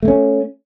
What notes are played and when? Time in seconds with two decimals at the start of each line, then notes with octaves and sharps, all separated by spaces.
0.03 A3
0.05 A#3
0.08 C#4